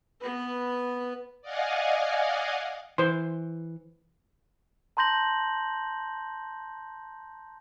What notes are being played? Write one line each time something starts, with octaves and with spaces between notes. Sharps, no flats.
B3 B4
D5 D#5 F5 F#5 G#5
E3 C5 C6
A5 A#5 C6 G6 A#6 F#7